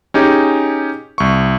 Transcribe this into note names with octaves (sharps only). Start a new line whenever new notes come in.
C#4 D#4 G4 G#4
C2 C#6